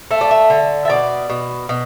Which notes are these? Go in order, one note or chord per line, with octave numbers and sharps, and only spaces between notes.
A3 E5
D5
E5
D3
E5
B2 D5
B2
B2